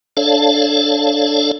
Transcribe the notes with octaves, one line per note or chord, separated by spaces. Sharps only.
D4 A4 C#5 D5 F5 A5